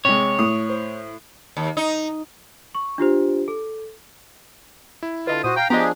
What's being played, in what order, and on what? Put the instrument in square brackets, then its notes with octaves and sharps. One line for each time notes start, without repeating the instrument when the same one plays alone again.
[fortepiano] C3 G#3 [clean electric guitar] C#5
[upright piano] A2 [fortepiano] D#6
[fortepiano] C5
[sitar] D#2
D#4
[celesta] C#6
D4 F4 G4 C5
A4
[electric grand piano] E4
[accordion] D3 [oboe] F4 [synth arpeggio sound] B4 D#5 A5
[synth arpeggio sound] A#2 [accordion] F#4 C5 [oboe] D#6
[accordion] F5 A#5 [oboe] G5
[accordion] F3 D4 G#4 [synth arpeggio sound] B3 F4 [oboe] G4 [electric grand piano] D#5 A#5